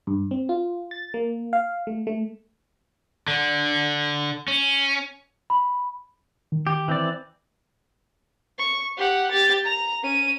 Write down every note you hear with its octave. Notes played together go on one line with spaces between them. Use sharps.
G2
C4
F4
A6
A#3
F5
A3
A3
D3
C#4
B5
D#3
G4
E3 C4 D5
C#6
G4 F#5
G4 A6
A#5
C#4 D#7